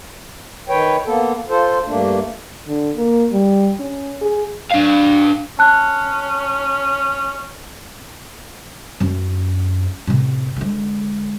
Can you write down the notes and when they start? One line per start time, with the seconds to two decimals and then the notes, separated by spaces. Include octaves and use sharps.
0.69 D#3 B4 C#5 G5
1.06 A#3 B3 A4
1.49 F4 A4 C5
1.86 G2 A3 A#3 D4
2.67 D3
2.97 A#3
3.32 G3
3.79 C#4
4.21 G#4
4.71 D4 F5
5.59 C#4 A5 F#6
9.00 F#2 C#4
10.07 A2 C3
10.56 D3 G#3